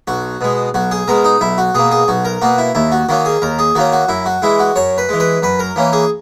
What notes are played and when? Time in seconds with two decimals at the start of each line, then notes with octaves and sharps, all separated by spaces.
0.08 B1 F#4
0.41 B2 G#3
0.74 B1 F#4
0.91 G#4
1.08 B2 G#3 A#4
1.25 D#4
1.41 B1 E4
1.58 F#4
1.75 B2 A#3 G#4
1.91 G#4
2.08 B1 F#4
2.25 A#4
2.42 B2 A#3 F#4
2.58 E4
2.75 D#2 E4
2.92 F#4
3.09 D#3 A#3 C#4 F#4
3.26 G#4
3.42 D#2 A#4
3.59 G#4
3.75 D#3 A#3 C#4 F#4
3.93 F#4
4.08 F#2 E4
4.26 F#4
4.42 E3 G#3 E4
4.59 F#4
4.76 F#2 C#5
4.98 B4
5.09 E3 G#3
5.20 B4
5.42 F#2 B4
5.59 A#4
5.76 E3 A#3 C#4
5.93 G#4